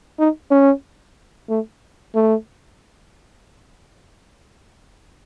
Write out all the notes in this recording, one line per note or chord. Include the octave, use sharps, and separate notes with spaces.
D#4
C#4
A3
A3